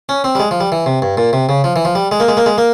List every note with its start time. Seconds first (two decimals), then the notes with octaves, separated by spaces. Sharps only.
0.09 C#4
0.24 C4
0.35 G3
0.40 G#3
0.51 F3
0.60 G3
0.72 E3
0.86 C3
1.02 G2
1.17 A#2
1.33 C3
1.49 C#3
1.64 F3
1.76 E3
1.85 F3
1.95 G3
2.11 G#3
2.20 A#3
2.28 G#3
2.37 A#3
2.46 G#3
2.58 A#3